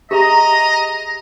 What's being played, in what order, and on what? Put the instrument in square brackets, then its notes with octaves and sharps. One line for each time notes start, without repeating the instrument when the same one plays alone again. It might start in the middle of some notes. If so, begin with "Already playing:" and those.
[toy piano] G4 G#4 E5 [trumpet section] D#5 [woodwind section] A#5